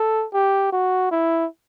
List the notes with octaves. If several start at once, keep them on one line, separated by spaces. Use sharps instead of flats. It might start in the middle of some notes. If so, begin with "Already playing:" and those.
Already playing: A4
G4
F#4
E4